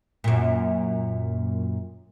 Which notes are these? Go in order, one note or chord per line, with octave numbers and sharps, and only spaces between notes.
F#2 A#2